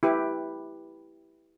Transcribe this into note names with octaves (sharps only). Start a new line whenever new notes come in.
E4 G4 B4